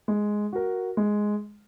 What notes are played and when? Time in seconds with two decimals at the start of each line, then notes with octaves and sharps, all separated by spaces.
0.08 G#3
0.53 F#4 A#4
0.97 G#3